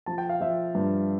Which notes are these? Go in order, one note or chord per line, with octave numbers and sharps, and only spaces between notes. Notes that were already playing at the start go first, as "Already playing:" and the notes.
F3 A5
G5
F5
F3 E5 G5
G2